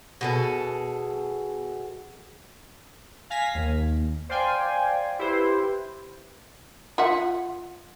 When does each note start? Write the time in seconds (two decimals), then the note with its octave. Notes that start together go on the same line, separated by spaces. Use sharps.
0.21 B2 G#4 A4
3.30 F5 G#5 A#6 B6
3.55 D#2
4.29 C5 D5 F5 G5 G#5
5.19 E4 G4 B4 C5
6.98 F4 E5 F#5